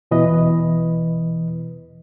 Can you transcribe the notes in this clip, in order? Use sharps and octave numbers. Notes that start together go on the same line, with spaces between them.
E2 B2 E3 B4 D#5